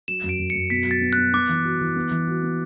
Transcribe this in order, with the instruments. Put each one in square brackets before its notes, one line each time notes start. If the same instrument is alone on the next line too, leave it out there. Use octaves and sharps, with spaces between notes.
[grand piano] F#3 [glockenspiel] E7
[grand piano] F#2
[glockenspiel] D7
[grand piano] F#2
[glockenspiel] C#7
[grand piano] F#2
[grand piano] B2 [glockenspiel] B6
[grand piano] F#3 [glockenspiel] A6
[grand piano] B3
[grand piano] B3 [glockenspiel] F#6
[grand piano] B3 [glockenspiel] D6
[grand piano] E3
F#4
E3
B3
E3
F#4
B3